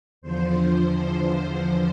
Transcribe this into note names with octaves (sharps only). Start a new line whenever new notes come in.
E2 D3 F3 C5